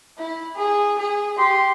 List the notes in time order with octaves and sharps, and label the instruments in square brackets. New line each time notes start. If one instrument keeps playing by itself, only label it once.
[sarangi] E4
G#4
G#4
[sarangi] G4 [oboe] C6